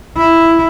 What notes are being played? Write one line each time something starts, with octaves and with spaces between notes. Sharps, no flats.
E4